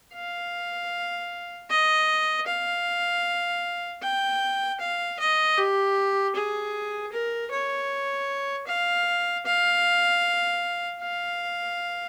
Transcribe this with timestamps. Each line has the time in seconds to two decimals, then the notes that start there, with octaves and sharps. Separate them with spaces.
0.14 F5
1.70 D#5
2.47 F5
4.02 G5
4.80 F5
5.19 D#5
5.58 G4
6.36 G#4
7.12 A#4
7.51 C#5
8.67 F5
9.46 F5
11.01 F5